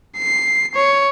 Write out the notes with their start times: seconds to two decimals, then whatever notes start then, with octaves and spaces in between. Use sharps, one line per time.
0.17 C7
0.75 C#5